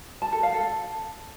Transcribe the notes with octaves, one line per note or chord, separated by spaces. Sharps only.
A5
A4
F5
A4